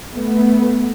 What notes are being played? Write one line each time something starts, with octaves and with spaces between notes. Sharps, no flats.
A3 B3